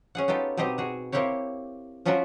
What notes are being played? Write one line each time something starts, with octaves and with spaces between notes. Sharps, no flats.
C#4 G#4 F#5
B3 D#4 F4 G4 A4
B2 C4 D#4 G4 D#5 A#5
F#4 G#4
A#3 C4 E4 G4 C#5
F3 C#4 F4 F#4 A#4 E5